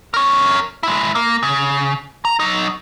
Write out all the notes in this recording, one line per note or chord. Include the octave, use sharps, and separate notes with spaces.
A#4 C#5
G#3 E4
A#3
C#3
A#5
F#3 D#4